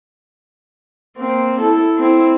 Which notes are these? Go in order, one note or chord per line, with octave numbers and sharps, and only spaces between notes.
A#3 C4
E4 A4
C4 E4